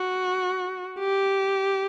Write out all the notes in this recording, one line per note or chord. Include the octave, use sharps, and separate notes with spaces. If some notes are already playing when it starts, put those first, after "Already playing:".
Already playing: F#4
G4